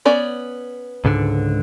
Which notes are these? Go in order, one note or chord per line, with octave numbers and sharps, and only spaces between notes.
B3 C#4 D5
C#2 G#2 D3